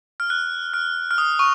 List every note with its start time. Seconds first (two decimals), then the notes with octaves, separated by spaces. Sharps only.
0.20 F6
0.30 F#6
0.74 F6
1.11 F6
1.18 D#6
1.39 C#6